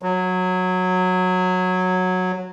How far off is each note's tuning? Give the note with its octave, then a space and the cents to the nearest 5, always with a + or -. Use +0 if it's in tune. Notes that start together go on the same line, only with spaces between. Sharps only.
F#3 -15